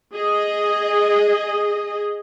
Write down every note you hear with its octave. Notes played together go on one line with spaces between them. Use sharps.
G#4 D#5